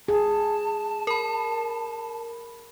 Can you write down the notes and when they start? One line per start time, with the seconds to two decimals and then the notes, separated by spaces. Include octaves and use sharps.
0.08 G#4 A5
1.07 A#4 B5